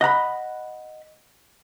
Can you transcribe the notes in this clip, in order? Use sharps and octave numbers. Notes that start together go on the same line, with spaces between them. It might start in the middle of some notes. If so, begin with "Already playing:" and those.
D#5 F#5 A#5 B5